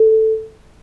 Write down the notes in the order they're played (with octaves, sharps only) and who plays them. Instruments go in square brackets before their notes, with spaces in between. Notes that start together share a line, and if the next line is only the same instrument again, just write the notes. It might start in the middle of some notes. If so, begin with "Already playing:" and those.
Already playing: [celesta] A4